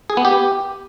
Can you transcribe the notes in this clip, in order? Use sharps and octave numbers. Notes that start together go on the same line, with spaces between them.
G#4
B3
G4